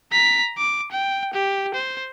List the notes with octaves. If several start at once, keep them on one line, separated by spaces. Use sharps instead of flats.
A#5 B6
D6
G5
G4
C5